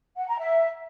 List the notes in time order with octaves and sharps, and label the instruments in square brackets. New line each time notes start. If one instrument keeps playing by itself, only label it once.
[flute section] F#5
A#5
E5